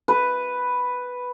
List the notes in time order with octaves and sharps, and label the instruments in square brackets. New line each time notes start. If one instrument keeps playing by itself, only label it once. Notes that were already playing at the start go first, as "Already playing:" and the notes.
[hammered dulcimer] B4